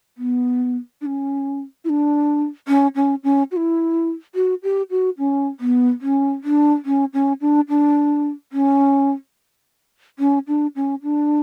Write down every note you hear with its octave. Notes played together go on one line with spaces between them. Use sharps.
B3
D4
C#4
E4
D4
C#4
C#4
C#4
F#4
E4
F#4
G4
F#4
C#4
B3
C#4
D4
C#4
C#4
D4
D4
C#4
C#4
D4
C#4
D4